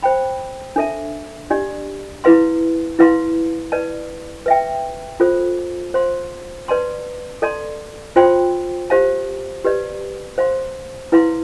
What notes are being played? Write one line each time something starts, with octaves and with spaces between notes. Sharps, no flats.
C5 G5 B5
D4 A4 E5 A5
D4 G4 D5
E4 B4 F5 C6
E4 B4 F5 C6
B4 D5 A5
B4 E5 G5
F4 A4 C5
C5 F5 C6
B4 D5 A5 C6
A4 D5 A5 C6
F4 C5 G5 C6
G4 C5 F5 A5
G4 B4 D5
C5 F5 C6
E4 B4 F5 C6